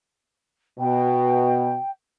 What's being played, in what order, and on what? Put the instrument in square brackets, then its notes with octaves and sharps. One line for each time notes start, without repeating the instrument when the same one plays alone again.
[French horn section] B2 [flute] G5